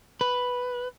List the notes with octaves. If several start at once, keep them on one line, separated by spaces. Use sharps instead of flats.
B4